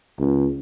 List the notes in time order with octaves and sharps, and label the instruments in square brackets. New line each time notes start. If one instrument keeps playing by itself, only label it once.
[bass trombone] C#2